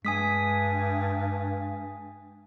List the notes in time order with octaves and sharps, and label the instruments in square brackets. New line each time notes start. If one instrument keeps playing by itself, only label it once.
[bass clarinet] G2 [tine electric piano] G#3 [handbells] G#5 D#6 B6